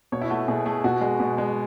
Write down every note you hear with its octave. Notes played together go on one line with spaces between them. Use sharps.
B2 C#5
E4
A3 F#4
B2 G#4
A3 G#4
B2 F#4
G#3
B2
G#3